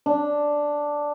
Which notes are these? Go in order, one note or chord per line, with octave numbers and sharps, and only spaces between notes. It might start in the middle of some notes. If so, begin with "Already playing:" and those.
D4